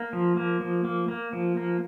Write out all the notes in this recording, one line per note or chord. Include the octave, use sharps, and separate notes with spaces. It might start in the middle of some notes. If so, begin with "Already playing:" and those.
Already playing: A#3
F3
A#3
F3
A#3
A#3
F3
A#3